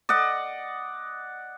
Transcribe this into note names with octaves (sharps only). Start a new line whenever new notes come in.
D5 D#5 F#5